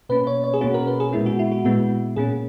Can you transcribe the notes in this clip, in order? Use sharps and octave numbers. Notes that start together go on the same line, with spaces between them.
B2 A#3 C#4 B4
C#5
C#5
G#4
B2 A#3 C#4 F#4
A#4
B4
G#4
A#2 G#3 B3 E4
F#4
E4
F#4
A#2 G#3 B3 F#4
A#2 A#3 C#4 G#4